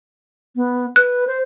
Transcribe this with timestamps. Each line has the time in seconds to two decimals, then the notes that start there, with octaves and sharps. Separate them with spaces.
0.56 B3
0.96 B4 F#6
1.27 C5